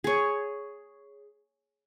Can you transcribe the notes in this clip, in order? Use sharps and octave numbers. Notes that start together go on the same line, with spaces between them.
G#4 C#5